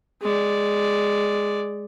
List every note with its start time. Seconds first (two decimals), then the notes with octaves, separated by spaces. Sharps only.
0.22 G#3 D5